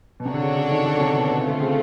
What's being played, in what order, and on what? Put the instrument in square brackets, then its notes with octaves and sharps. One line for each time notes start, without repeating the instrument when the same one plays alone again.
[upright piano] B2
[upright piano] C3 [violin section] D4 F#4 A4 C#5
[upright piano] D3
C#3
C#3
D#3
D3
C3
B2
B2
[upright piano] D3 [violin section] A3 C4 F4
[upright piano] C#3